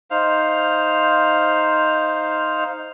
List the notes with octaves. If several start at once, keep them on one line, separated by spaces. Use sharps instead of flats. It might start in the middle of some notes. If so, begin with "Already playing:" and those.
D#4 C5 F5